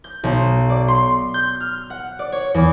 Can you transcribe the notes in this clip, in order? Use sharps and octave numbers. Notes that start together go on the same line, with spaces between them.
G6
B1
D5
C6
G6
F6
F#5
D5
C#5
E2